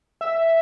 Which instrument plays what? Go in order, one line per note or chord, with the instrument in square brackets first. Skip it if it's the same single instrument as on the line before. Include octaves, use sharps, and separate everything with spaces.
[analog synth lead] E5